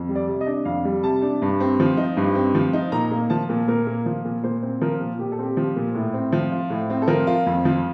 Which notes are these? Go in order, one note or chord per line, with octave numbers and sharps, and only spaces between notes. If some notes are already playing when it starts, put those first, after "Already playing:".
Already playing: F2
G3
D5
C3
D#5
D4
F2 F5
G3
C3 A5
D4
G2
C4
F3
D#4
G2
C4
F3
D#4
A#2 A#5
A#3
F3 A5
A#2
A#2 A#4
A#3
F3
A#2
A#2 C5
C4
F3 A#4
A#2
A#2 G4
A4
C4 G4
F3
A#2
A2
C4
F3
F4
A2
C4
A4
F3 A#4
F4
F2
F3